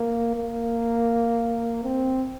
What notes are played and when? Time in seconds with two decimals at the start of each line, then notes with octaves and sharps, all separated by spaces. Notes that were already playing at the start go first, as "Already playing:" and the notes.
Already playing: A#3
0.36 A#3
1.83 C4